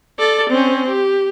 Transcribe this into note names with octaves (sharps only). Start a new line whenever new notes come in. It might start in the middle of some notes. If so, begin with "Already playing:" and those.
A4 D5
C4 C#4
G4